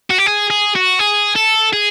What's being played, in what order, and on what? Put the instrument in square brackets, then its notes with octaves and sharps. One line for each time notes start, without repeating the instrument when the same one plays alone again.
[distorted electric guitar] F#4
G4
G#4
G#4
F#4
G#4
A4
G#4